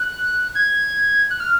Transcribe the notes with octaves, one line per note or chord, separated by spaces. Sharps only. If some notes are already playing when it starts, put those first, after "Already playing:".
Already playing: F#6
G#6
F#6
F6